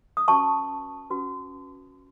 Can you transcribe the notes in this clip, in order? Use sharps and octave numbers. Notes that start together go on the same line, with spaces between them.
D#6
C#4 F#4 B4 A5 C#6
C#4 F#4 B4